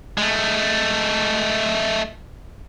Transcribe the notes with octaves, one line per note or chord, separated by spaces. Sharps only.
G#3 A3